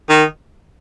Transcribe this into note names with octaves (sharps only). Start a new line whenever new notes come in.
D#3